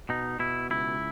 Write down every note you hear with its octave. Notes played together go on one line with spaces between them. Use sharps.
B2 D#4
B2 E4
C#2 E4